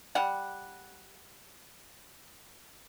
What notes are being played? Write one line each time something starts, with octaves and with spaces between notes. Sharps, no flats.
G3 F#5